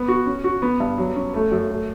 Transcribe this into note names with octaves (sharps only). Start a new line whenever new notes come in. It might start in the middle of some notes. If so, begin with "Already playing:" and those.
Already playing: B3
F#4
C#4
F#4
B3
G2
F#3
C#4
A3
F#2
A3